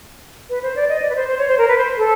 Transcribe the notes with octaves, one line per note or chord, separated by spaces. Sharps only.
B4
C5
D5
D#5
D5
B4
C5
C5
C#5
C5
A#4
B4
C5
A4